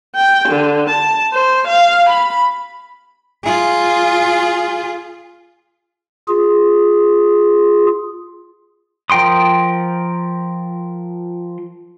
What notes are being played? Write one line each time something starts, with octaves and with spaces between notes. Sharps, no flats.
G5
D3
A5
C5
F5
B5
F4 G#4
F4 G#4
F3 A#4 G5 C6 D#6